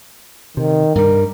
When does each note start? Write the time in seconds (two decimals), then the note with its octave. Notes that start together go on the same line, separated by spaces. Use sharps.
0.57 C3 D#3
0.95 G2 G3 A#4